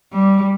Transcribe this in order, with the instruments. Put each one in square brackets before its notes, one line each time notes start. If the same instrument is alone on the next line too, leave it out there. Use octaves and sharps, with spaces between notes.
[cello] G3